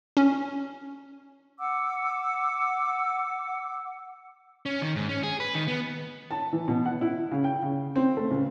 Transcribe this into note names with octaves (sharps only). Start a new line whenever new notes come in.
C#4
F#5 D6 E6
C#4
D#3
G#2
C#4
G#4
B4
D#3
B3
A5
E3
B2
F#5
E4
C#3
G5
C#3
C4
A3
C#2